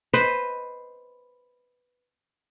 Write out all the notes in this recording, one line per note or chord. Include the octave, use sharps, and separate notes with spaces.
B4 C5 D#5